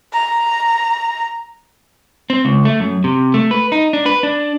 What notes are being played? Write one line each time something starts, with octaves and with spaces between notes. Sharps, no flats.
A#5
C4
C#2
A3
F#2
C3
A3
B4
D#4
D4
B4
D4